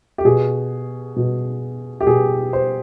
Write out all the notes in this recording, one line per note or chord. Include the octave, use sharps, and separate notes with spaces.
G4
B2 G#4
B2
G4
B2 G#4
C5